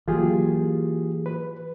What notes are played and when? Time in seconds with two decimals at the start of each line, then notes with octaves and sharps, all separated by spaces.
0.08 E3 F#3 A#3 F4 G4 G#4
1.26 B4